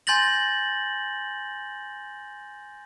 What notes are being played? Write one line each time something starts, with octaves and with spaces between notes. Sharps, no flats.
G#5 C6 G6 A6 A#6 F#7